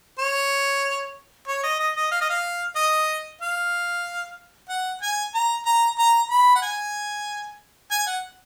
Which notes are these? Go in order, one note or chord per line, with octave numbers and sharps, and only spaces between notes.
C#5
C#5
D#5
D#5
D#5
F5
D#5
F5
D#5
F5
F#5
G#5
A#5
A#5
A#5
B5
F#5
G#5
G#5
F#5